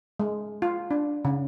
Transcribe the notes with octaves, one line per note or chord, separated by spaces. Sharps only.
G#3
F4
D4
C#3